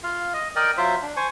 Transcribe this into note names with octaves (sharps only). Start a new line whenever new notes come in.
F4 F5
D#5
A#4 D5 D#5 G5
F#3 F4 C5 E5
D4
C5 G#5 C#6